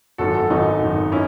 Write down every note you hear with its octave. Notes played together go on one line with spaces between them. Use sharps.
G#1 F#2 D#3 F#4 A4
F#4 A4
G#1 F#2 D#3 D#4 F#4
G#1 F#2 D#3
C#4 E4